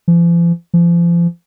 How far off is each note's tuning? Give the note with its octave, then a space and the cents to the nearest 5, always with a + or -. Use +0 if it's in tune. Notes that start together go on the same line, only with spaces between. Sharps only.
F3 -45
F3 -35